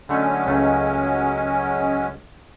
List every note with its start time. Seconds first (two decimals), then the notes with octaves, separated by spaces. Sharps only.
0.09 D3 F#3 G#3 A3 C#4
0.47 C#2 A3